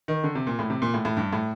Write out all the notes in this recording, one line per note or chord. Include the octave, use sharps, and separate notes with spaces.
D#3
D3
C3
A#2
A2
C3
A#2
A2
A2
G2
A2